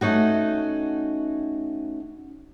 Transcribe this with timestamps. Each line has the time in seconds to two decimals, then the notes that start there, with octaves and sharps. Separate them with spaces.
0.01 A3 C#4 D#4 F#4